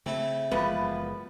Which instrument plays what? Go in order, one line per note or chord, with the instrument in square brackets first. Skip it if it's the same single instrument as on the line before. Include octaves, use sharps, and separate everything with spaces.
[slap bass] C#3 [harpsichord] A3 E4 [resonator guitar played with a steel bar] C4
[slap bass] F#1 G#3 B3 [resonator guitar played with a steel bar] E2 F3 B4